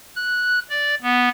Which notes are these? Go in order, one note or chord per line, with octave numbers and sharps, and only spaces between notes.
F#6
D5
B3